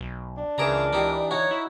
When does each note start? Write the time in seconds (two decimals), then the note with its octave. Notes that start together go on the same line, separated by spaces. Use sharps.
0.01 B1
0.37 D4
0.58 C#2 C#3 E3 G#4 A#4 A#5 D6
0.93 E3 D#4 G4
1.31 D#4 F#4 C#5
1.51 E4